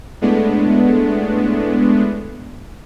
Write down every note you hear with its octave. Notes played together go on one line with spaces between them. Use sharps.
A2 G#3 A3 B3 D4